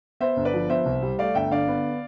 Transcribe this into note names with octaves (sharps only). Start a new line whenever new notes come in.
B3 C5 E5
G1
B4 D5
F3
B3 C5 E5
C2
G3
A3 D5 F5
G1 E5 G5
D3 D5 F5
B3